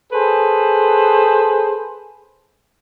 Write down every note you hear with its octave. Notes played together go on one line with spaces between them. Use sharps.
G#4 A4 B4 C5